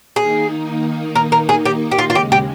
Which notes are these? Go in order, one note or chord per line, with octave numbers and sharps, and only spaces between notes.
D#3 A#3 D#4 G#4
A#4
A#4
G#4
G4
G4
F4
F4
D#2 C#3 G#3 G4
G4